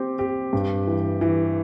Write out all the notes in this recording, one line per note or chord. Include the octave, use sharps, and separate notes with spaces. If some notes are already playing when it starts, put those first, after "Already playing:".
Already playing: C4 G4
G4
G2
E3
E3